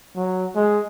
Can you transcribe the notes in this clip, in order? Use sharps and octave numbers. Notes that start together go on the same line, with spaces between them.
F#3
G#3